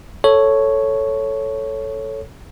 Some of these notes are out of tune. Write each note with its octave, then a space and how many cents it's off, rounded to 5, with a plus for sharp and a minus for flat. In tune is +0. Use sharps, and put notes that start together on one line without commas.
A4 +0 C#5 +0